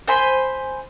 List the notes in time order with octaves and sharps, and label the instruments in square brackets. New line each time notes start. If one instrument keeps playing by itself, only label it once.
[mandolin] C5 G#5 B5 C6